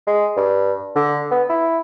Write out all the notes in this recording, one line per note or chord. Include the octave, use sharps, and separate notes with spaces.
G#3
G2
D3
B3
E4